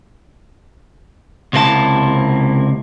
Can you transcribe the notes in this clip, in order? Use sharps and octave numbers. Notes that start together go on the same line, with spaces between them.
C#2 C3 A#3 E4 A5